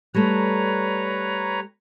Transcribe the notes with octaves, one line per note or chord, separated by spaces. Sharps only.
G3 A3 B4 C#5 A#5